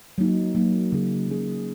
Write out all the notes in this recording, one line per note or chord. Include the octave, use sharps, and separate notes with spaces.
F#3 A#3 D#4
F#3 A#3 D#4
C#3 F#3 C#4 G#4
C#3 F#3 C#4 G#4